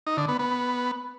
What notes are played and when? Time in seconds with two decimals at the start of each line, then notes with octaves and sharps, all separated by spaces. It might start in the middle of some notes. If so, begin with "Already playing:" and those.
0.07 D#4
0.17 D3
0.28 B3
0.39 B3